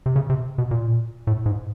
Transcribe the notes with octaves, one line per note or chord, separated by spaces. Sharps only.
C3
C#3
C3
B2
A#2
A2
G#2